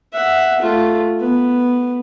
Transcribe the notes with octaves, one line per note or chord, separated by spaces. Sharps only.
E5 F#5
A3 F4
B3